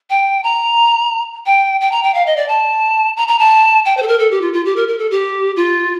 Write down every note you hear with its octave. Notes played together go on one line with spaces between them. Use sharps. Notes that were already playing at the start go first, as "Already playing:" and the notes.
G5
A#5
G5
G5
A#5
G5
F5
D#5
D5
A5
A#5
A#5
A5
G5
C5
A4
A#4
A4
G4
F4
F4
G4
A#4
A#4
A4
G4
F4